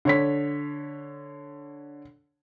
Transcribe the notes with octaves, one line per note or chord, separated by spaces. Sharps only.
D3 C#5 B6